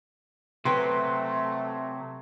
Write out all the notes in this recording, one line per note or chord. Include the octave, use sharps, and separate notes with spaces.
C3 F#3 A3 B4 G5 C6